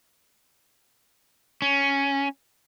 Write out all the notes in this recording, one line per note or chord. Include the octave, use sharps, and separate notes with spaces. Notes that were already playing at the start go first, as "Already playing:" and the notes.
C#4